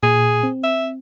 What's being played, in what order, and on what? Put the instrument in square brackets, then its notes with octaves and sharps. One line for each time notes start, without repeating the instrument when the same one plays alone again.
[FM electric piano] A#2 [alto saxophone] G#4
[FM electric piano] C4
[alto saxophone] E5